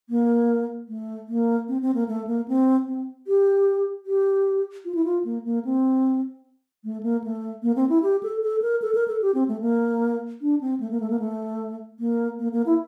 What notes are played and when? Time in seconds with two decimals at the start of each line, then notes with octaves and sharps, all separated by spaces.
0.09 A#3
0.88 A3
1.28 A#3
1.68 C4
1.82 C4
1.95 A#3
2.08 A3
2.27 A#3
2.48 C4
2.87 C4
3.27 G4
4.06 G4
4.85 F4
4.95 E4
5.05 F4
5.25 A#3
5.45 A#3
5.65 C4
6.84 A3
7.03 A#3
7.24 A3
7.63 A#3
7.76 C4
7.89 E4
8.03 G4
8.23 A4
8.43 A4
8.62 A#4
8.82 A4
8.95 A#4
9.08 A4
9.22 G4
9.34 C4
9.48 A3
9.61 A#3
10.41 D4
10.61 C4
10.80 A3
10.91 A#3
11.00 A3
11.10 A#3
11.19 A3
12.00 A#3
12.39 A#3
12.53 A#3
12.66 E4